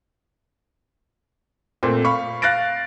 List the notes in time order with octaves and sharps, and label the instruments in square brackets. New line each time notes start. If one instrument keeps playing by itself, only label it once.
[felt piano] A#2 A3 C4
F5 B5 C#6
F5 F#6 A6 A#6 D7